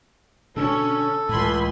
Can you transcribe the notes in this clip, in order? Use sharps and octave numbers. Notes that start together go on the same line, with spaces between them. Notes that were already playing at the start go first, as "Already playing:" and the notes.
B2 D3 C#4 D4 A4
C#2 A2 E3 G#5 B5 C6